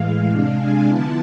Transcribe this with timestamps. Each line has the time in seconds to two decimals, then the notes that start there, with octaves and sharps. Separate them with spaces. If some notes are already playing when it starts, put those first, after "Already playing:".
Already playing: A2 E3 G#3 F5
0.30 C3 G#3 D4
0.58 G#5
0.87 D3 F3 B3 E4 A5